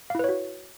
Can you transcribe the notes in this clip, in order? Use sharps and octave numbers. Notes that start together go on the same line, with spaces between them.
E4 F#4 B4 C#5 F5